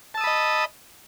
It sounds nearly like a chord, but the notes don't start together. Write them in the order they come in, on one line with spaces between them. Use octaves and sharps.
A5 E6 D#6 B5 D#5